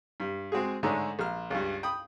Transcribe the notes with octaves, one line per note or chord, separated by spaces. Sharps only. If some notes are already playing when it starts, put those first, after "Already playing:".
G2
G#3 C4 F#4 G#4
G#2 D3 G#3 A3 C#4 D4
A#1 F6
C#2 G2
G5 B5 D#6